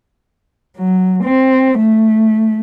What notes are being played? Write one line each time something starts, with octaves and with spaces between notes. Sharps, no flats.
F#3
C4
A3